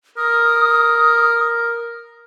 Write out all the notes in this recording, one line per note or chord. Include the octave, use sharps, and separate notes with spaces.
A#4 D#6